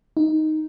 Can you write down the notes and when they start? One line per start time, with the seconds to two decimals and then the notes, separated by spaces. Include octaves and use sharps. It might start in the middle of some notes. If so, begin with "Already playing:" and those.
0.17 D#4